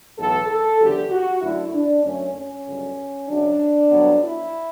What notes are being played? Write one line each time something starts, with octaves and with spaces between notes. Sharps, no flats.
B1 A2 E3 B3 A4
A4
F#1 E2 D3 A3 G4
F#4
F#2 D3 A3 E4
D4
F#2 D3 A3 C#4
C#4
G1 F#2 C#3
F#1 F#2 C#3 F#3 D4
G1 G2 F#3 B3
E4